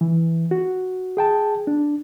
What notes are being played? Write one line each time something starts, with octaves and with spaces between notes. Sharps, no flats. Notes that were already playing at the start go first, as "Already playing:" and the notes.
E3
F#4
G#4 G5 A5
D4